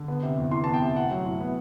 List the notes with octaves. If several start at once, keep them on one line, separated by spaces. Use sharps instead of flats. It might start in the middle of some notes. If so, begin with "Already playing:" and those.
Already playing: D3
B3
C3
E2
E3 C6
B3 A5
G5
C3
A2 F#5
F#3
A2
B3